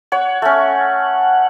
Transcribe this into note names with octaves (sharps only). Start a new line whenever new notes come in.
C#5 F#5
A3 C#4